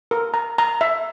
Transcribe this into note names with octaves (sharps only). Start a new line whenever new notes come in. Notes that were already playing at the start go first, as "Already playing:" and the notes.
A#4
A#5
A#5
E5